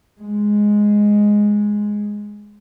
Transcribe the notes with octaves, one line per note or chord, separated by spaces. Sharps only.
G#3